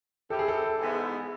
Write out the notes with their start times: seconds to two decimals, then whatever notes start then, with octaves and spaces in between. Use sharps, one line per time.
0.30 G3 C4 E4 G4 A4
0.39 G#4
0.48 A4
0.80 G#2 E3 G#3 B3 E4